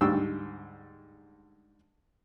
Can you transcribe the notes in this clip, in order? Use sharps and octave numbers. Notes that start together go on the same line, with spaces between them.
D2 G#2 G3 G5 C#6 E6